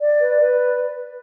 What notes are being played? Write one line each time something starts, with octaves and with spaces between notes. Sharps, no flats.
D5
B4
B4